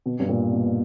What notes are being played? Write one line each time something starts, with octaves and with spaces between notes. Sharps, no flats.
B2
G2
A#2
B2